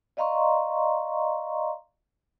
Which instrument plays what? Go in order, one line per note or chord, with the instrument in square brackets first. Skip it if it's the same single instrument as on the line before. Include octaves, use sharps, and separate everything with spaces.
[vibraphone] D5 D#5 F5 A#5 C6 C#6